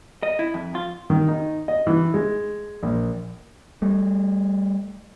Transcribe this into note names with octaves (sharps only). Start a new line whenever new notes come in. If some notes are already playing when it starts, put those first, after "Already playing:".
D#5
E4
F2
F4
D#3
D#4
D#5
E3
G#3
A#1
G3 A3